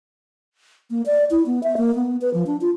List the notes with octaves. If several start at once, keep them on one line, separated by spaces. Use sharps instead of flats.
A#3
D5
E4
B3
E5
A#3
B3
B4
F3
D4
F4